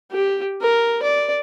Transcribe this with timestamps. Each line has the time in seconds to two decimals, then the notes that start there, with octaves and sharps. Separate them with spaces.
0.12 G4
0.62 A#4
1.03 D5